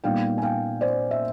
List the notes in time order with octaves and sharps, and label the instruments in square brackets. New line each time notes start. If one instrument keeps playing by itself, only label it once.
[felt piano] A#2 G3 B3 D#4 F5 G5
G#5
F5 G5
C5 D5
E5